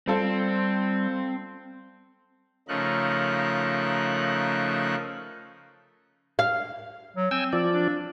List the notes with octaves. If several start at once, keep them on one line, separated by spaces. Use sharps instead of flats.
G3 C4 F4 A4 C5
C#3 F3 A3 D#4 A#4 F#6
F5
F#3
C4 G5 G#5 E6
F3 D5
D4